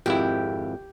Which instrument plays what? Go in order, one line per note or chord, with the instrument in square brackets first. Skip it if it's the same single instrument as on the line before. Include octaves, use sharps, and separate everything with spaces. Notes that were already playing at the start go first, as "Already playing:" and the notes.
[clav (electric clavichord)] G#1 F2 E4 [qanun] G4